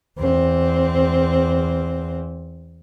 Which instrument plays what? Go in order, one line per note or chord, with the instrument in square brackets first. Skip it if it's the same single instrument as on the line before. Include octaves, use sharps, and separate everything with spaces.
[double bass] E2 C4